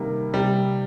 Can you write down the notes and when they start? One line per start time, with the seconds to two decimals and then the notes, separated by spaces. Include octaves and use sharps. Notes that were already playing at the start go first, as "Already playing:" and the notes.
Already playing: C3 D#3 G3 A#3
0.33 C3 G3